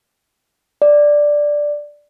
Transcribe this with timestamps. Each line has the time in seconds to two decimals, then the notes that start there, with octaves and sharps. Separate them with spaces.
0.82 D5